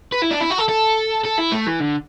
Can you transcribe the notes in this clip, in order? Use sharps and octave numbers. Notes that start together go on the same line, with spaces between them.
B4
E4
D4
E4
F#4
A4
A4
A4
E4
A3
E3
D3